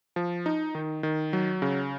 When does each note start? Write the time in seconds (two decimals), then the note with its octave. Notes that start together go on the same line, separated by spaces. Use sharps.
0.16 F3
0.46 D#4
0.75 D#3
1.03 D#3
1.33 F#3
1.62 C#3